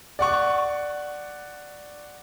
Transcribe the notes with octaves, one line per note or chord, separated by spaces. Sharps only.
D5 F#5 C#6